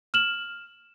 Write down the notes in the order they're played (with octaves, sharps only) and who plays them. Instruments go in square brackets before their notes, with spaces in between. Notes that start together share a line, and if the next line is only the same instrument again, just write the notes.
[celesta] F6 E7 F#7